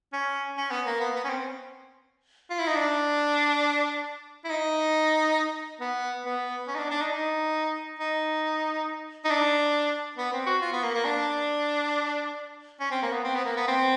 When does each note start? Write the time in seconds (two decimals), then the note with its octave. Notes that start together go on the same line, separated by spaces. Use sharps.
0.13 C#4
0.58 C#4
0.71 B3
0.86 A#3
1.00 B3
1.16 B3
1.24 C#4
1.30 C4
2.50 F4
2.59 E4
2.67 D#4
2.76 D4
4.44 E4
4.50 D#4
5.81 B3
6.25 B3
6.68 C#4
6.75 D#4
6.79 D4
6.90 D4
7.01 D#4
7.12 D#4
7.99 D#4
9.25 D#4
9.31 D4
10.18 B3
10.33 C4
10.46 F#4
10.62 F4
10.73 B3
10.83 A#3
10.94 A#3
11.05 D4
12.80 C#4
12.91 C4
13.02 A#3
13.12 B3
13.24 C4
13.35 B3
13.45 A#3
13.56 B3
13.68 C4